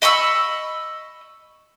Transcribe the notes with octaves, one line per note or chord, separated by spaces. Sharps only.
D#5 B5 C#6 E6